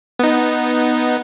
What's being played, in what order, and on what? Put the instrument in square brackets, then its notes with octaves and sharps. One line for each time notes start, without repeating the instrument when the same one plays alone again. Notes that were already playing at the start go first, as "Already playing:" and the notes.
[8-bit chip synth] B3 D#4